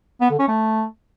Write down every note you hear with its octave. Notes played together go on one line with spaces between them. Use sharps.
B3
D3
C#4
A3